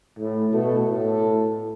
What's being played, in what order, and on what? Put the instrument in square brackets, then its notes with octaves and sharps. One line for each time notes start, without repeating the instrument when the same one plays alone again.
[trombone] A2
[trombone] B2 [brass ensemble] A3 A4
[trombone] A2 [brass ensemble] A3 A4